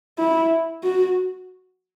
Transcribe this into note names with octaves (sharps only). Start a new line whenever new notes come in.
E4
F#4